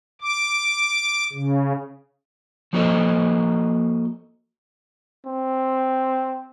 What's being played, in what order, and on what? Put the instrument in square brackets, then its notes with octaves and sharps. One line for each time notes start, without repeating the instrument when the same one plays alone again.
[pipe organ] D6
C#3
[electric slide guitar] F3 A#3 F#4 A4 C5 D#5
[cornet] C4